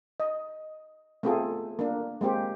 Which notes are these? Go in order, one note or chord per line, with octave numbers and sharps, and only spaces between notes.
D#5
A3 B3 C4 F4 G#4 A4
A#3 D4
G#3 A#3 C4 G4 C5